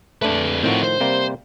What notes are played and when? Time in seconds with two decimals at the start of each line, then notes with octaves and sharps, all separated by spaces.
0.22 F2 A3 D4 B4
0.63 A2 D#3 F3 C4 F#4
0.83 C5
1.01 C3 G3 A#3